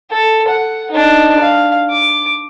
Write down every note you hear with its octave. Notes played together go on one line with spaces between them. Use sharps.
A4
F#5
D4 D#4
F5
D6